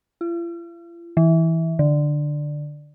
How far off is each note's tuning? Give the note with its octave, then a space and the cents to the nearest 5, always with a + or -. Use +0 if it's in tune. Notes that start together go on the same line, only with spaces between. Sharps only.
F4 -45
E3 -15
D3 +10